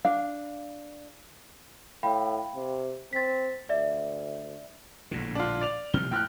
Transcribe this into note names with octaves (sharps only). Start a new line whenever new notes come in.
D4 F5
A2 F5 G5 B5
C3
C4 A6 B6
D2 D5 E5
A#1 A2 D3
D4 F4
D5 F7
C3 F3 G3 F6 G7
A2 G5 F6 F#6